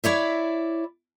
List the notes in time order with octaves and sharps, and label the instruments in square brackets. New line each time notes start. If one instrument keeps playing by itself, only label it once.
[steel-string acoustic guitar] E4 C#5 D5 E5